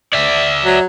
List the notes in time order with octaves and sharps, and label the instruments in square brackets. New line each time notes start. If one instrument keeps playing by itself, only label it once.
[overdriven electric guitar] D5 E5
[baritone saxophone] F#3